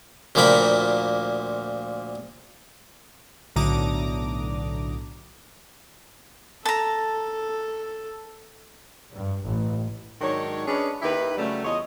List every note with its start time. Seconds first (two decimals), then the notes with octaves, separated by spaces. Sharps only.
0.35 D2 A#2 F3 A#3 G5 B5
3.56 B1 A2 D3 A#5 D6 D#6
6.66 A4 A5 A#5
9.13 G2
9.45 A1
10.21 G#2 D#3 F#3 D4 C#5
10.68 C#4 D4 G#4 B4 C#5 D#5
11.02 D#2 D#3 E4 G4 B4
11.37 C#3 F#3 G3 A3
11.65 E2 F4 C#5 D#5